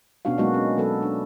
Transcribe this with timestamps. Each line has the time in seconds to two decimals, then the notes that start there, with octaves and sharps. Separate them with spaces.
0.25 B2 B3 C#4 D4 F#4 F5
0.38 F#3 G#3 A#3 B3 D#4 F#4
0.54 C#4
0.77 F#3 B3 A4 B4
1.02 D4